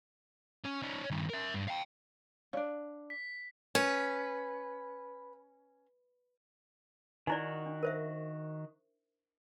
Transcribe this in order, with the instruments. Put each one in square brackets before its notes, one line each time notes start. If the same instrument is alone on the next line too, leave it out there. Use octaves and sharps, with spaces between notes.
[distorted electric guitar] C#4
C#4 D#4
G2 D#3
A#4 E5
G2
F5 G5
[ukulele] C#4 D4 [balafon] C#5 D5 F5
[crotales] B6
[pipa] C#4 [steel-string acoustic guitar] B4
[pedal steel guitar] D#3 F#4 [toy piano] D#4 E4 D5
[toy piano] D4
A#4 C5 E5